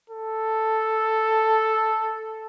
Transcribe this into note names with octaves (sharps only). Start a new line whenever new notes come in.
A4